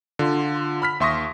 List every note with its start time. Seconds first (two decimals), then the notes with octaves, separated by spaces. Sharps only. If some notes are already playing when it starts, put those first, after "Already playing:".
0.19 D3 F4
0.82 B5 F6 B6
1.00 D#2 E5 C6 C#6 D#6 A#6